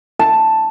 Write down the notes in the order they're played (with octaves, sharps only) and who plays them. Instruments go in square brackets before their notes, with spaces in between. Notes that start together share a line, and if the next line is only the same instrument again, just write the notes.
[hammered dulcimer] A5